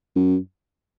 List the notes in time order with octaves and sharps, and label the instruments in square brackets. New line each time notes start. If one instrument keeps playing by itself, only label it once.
[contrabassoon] F#2